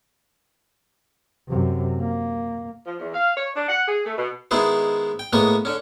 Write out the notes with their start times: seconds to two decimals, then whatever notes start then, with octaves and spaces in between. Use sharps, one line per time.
1.48 F#2 C3
1.99 A#3
2.86 F3
3.00 E2
3.13 F5
3.37 C#5
3.56 D4
3.68 F#5
3.88 G#4
4.05 A3
4.17 B2
4.51 D#3 G#3 B3 E4 G#4 C5
5.19 G5
5.33 A2 G#3 A#3 B3 C#6 D#6
5.65 D3 C#4